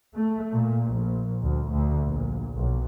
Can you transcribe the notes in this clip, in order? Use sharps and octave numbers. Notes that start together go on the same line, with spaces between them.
A3
A#2
A#1
D2
D2
A#1
B1